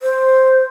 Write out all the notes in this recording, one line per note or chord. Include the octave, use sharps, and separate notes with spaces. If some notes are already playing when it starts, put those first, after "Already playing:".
C5